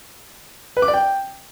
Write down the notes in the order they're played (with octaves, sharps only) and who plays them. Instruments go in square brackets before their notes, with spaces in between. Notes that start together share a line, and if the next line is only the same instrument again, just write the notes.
[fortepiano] B4
D6
D5
G5